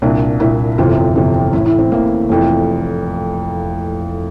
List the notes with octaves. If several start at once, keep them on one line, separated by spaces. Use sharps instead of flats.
C2 A#2 D4
C2 A#2 E4
G1 F2 C3 E3 F4
G1 F2 C3 E3
A1 A2 E3 E4
E4
C4
A1 A2 E3 A#3
F1 F2 E3